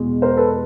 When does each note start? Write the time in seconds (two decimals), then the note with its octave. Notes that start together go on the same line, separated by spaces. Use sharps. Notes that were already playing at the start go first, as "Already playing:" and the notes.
Already playing: E2 B2 G#3
0.22 A#4 C5
0.37 A4 B4